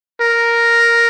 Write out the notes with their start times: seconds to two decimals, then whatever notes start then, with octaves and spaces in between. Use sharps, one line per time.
0.21 A#4